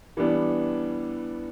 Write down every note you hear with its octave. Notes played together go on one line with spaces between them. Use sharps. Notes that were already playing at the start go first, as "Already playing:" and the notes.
E3 G3 B3 D4